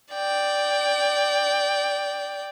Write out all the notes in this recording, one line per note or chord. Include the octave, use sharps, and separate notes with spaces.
D5 G5